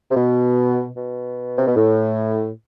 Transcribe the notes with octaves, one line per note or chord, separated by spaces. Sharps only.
C3
B2
B2
C3
B2
A2